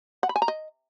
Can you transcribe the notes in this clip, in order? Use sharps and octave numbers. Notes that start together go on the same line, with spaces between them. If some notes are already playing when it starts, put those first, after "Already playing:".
F#5
B5
G#5
A#5
D#5